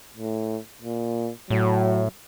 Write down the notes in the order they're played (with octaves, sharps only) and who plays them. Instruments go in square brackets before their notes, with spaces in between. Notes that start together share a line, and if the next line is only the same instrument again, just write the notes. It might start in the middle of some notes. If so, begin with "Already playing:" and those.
[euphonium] A2
A#2
[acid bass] A2 [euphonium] F#3